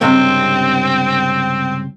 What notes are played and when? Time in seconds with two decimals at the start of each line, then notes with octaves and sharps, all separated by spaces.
0.01 C#2 G2 C3 C4